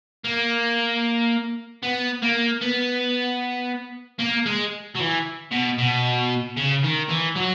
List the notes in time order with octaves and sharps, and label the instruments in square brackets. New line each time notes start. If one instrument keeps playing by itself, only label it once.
[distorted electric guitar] A#3
B3
A#3
B3
A#3
G#3
F#3
E3
B2
B2
C#3
D#3
E3
F#3